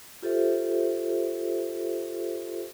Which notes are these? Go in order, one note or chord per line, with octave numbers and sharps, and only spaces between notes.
F4 G4 A4 C5 E5